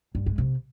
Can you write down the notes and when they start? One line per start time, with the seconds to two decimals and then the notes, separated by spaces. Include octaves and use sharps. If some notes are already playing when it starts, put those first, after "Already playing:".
0.15 G2
0.26 G#3
0.38 C3